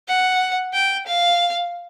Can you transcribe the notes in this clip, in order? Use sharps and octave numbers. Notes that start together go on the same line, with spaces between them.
F#5
G5
F5